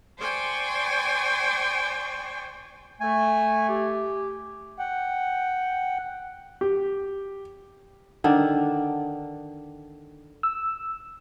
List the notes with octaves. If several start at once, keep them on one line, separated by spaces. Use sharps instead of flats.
C5 D5 G5 G#5 C#6
A3 G#5
G4
F#5 G5
G4
D3 D#3 D4
E6